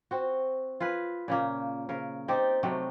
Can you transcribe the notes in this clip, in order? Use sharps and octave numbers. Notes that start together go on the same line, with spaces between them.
C4 F#4
F4 G#4 B4
A#2 C#3 A#3
C#3 A#4
C4 D#4 G4 D5
C3 F#3 A3 C4